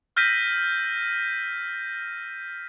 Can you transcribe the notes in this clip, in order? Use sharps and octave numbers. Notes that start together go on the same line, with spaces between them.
E6 F6 G6 A#6 B6 D#7